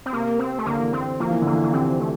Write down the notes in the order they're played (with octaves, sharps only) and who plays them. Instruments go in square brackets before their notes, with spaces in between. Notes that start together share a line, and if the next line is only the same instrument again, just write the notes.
[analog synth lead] C4
[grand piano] C3 [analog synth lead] A#3
[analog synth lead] C4
A3
[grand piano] D3 [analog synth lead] A#3
[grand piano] E3
[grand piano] D3 [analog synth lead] C4
[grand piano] F3 [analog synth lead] A#3
[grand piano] E3
[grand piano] D3 [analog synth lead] A#3
[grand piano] E3
[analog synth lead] A#3
[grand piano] C3 [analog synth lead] C4
[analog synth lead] A3